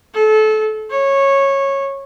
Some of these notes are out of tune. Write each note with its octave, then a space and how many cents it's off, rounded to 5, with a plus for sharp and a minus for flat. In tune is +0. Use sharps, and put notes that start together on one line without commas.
A4 -25
C#5 -15